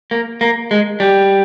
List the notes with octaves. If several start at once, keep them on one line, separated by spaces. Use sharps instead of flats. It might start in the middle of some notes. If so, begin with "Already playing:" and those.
A#3
A#3
G#3
G3